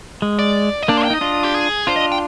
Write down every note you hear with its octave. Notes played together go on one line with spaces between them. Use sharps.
G#3
D5
D#5
A#3 D4 D5
C5
G5
D#4 D#5
D4 F4
G4
G#4
D4 F4 C5
D#5
G5